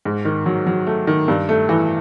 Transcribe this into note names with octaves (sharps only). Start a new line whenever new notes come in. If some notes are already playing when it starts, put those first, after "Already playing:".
G#2
D#3
F#3
F#3
A3
D#3
G2
A3
E3